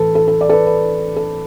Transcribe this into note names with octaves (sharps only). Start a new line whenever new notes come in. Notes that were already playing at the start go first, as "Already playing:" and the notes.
Already playing: A2 E3 A4 B4
A4
A4
D5
A4
B4
B4
A4